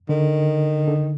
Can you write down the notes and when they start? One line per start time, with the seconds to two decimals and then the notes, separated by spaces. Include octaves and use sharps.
0.09 D3 D#3
0.87 D3